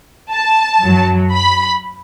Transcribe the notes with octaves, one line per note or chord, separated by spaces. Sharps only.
A5
F#2 F#3
B5